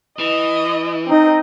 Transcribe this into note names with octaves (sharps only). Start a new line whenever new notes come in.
E3 D#5
C4 D#4 D#5